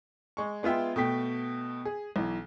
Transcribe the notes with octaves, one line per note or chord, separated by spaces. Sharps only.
G#3 C#6
G#3 B3 F4 E5 G5
B2 A3 G5 B6
G#4
B1 E3